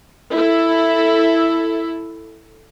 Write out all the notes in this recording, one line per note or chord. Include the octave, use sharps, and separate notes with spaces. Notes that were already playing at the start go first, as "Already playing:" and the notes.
E4 A4